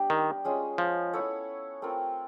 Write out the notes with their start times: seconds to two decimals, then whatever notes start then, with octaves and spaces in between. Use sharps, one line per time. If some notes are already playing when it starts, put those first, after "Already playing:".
Already playing: G3 B3 D4 G4
0.10 D#3
0.44 G#3 C#4 F4 G#4
0.78 F3
1.13 B3 E4 A4 C#5
1.82 A3 C4 F4 A#4